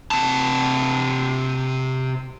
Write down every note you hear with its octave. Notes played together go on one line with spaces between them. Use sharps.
C3 A5